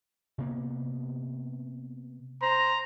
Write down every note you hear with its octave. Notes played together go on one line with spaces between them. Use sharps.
C3 A#3 B3
C5 A#5